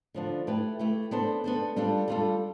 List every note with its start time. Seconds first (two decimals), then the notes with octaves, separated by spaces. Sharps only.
0.14 D3 F3 B3 D4
0.47 A3 E4 G4 B4
0.79 A3 E4 G4 B4
1.11 B3 D4 A4 C5
1.44 B3 D4 A4 C5
1.76 G3 D4 F4 A4
2.08 G3 D4 F4 A4